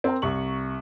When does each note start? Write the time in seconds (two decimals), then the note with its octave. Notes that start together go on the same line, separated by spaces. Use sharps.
0.04 C4 A#4 G5
0.22 C2 C#6 F#7